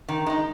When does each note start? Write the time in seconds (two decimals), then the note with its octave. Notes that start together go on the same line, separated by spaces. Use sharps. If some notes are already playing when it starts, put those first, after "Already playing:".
0.08 D#3
0.26 G#3 D#4